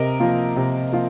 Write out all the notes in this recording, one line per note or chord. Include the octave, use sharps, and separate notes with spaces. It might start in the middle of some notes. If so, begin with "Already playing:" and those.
Already playing: C3 A#4 D#5
F3 A#3 F4
C3
F3 A#3 F4